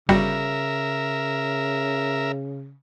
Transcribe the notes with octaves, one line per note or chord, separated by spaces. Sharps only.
G1 C#3 G3 F#4 A#4 E5